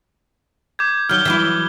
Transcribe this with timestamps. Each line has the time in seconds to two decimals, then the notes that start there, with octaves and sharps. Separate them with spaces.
0.79 D6 G6 G#6
1.09 D#2 F#3 F6 G6 G7
1.25 E3 F#3 E4